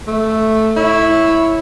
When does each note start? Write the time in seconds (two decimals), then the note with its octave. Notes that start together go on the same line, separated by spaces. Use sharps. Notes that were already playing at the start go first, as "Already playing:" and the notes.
0.07 A3
0.77 E4 C#5